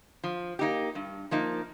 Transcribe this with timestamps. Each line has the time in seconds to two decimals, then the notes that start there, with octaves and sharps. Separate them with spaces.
0.24 F3
0.59 A#3 D#4 G4
0.95 G2
1.31 F3 A#3 D#4